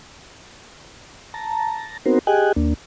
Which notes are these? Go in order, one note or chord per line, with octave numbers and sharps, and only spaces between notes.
A5 A#5
B3 C4 D#4 F#4 A#4 C5
G4 G#4 D#5 G5 G#5 F#6
D#2 A#3 D4